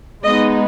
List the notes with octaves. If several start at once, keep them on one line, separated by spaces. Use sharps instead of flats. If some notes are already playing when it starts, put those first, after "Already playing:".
G#3 B3 D#4 D#5